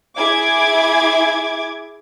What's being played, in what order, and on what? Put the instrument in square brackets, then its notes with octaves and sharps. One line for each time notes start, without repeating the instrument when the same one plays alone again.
[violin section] E4 G#4 D6 G#6